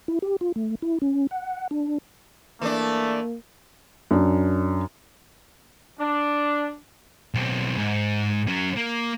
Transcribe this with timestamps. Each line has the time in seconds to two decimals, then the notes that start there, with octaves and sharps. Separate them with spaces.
0.08 E4
0.22 G4
0.41 F4
0.56 A3
0.82 E4
1.02 C#4
1.31 F#5
1.71 D4
2.62 E3 A3 A#3 D4
4.11 F#2 D4
6.00 D4
7.34 B1 C4
7.78 G#2
8.48 F#3 C#4
8.77 A#3